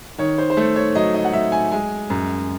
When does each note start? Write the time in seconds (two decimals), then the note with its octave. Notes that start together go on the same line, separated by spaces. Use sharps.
0.18 D#3 C#5
0.38 C5
0.50 C5
0.57 A3 A4
0.76 C#5
0.95 F#3 D#5
1.14 D#5
1.25 F#5
1.33 F#3 E5
1.52 G#5
1.72 G#3 G#5
2.10 F#2